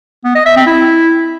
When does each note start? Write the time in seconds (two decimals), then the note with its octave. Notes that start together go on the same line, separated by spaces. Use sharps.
0.25 B3
0.35 D#5
0.46 E5
0.56 C4
0.67 E4